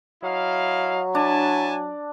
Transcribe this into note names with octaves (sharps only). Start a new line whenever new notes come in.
F#3 E4 D#5 F5
D4 E4 G#5 A5